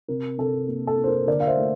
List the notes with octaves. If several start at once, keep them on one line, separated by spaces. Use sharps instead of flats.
C3 A#4
C3 A4
A#3
A4
A#3
C5
A#4
D3 A#4 D5
F5
C5 E5
A3